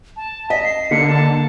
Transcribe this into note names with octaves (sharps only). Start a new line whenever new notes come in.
A5
D#5 B6
C7
D3 A#3 C#7
A5